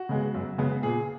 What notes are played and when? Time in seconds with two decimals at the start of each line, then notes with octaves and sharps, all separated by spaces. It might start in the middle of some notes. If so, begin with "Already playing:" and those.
Already playing: F#4
0.09 C#3 G#3 B3
0.34 F#2
0.58 C#3 G#3 B3
0.83 A#2 G#4